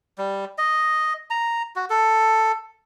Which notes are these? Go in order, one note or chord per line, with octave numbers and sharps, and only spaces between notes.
G3
D#5
A#5
F#4
A4